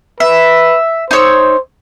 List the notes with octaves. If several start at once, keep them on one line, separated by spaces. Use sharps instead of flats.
B4 E5
D#4 C5 C#5 E6